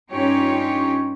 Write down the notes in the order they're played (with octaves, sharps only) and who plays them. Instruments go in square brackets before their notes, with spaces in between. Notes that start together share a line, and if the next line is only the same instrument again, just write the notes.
[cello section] G2 C#4 D#4 F4 G4 C#5